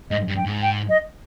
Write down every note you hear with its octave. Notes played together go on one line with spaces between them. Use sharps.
G#2 D#5
G2
G5
G#2
G5
D#5